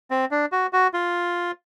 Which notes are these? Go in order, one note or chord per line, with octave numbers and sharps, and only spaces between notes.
C4
D4
F#4
F#4
F4